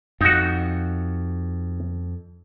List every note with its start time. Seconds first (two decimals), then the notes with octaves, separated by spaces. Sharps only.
0.21 F2 D#4 F#4